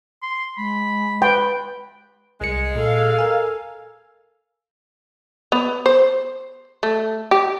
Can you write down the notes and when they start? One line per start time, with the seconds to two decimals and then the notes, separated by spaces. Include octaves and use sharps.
0.22 C6
0.57 G#3 B5
1.22 B4 G5
2.41 C2 G#3 C#7
2.76 A#2 G#4 A4 F5
3.19 A#4 G#5
5.52 B3
5.86 C5
6.83 A3
7.31 G4